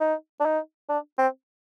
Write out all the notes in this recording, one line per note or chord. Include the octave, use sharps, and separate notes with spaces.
D#4
D4
D#4
D4
C4